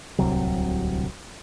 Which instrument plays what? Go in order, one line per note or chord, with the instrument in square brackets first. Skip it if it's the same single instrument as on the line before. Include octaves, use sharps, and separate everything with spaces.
[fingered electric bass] D1 C2 C3 F#3